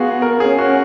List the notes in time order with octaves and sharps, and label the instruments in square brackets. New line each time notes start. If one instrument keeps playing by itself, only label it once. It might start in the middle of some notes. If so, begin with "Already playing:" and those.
Already playing: [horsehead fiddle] B3 [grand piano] F4 F#4 G#4
[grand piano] A#4
[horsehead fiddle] C#4 [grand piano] G#4
[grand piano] F#4